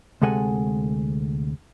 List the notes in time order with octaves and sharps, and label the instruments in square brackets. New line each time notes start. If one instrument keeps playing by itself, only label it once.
[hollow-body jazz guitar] D2 C3 G#3 A4 F#5 G#5